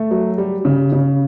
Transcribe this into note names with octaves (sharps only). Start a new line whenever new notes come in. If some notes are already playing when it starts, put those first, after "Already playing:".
Already playing: A3
F#3
G3
C#3
C#3